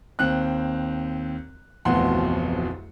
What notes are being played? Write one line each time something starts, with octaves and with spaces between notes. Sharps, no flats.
D#2 C4 F#6
D1 A1 F2 B2 F#5 C6